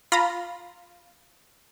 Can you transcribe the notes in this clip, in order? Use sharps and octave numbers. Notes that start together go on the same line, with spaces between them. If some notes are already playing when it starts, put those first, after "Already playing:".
F4 A#5 B5